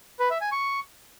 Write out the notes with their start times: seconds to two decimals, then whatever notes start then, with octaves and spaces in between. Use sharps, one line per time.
0.20 B4
0.30 E5
0.41 G#5
0.52 C#6